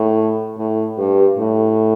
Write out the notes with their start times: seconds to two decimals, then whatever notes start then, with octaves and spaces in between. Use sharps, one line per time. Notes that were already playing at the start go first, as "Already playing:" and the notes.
Already playing: A2
0.58 A2
0.98 G2
1.38 A2